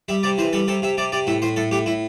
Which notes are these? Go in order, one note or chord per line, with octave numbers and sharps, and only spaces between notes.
G3 E5
C3 D5
E3 C5
G3 A4
C3 A4
C3 E5
C3 D5
C3 D5
A2 E5
A2 C5
A2 A4
A2 G4
A2 E4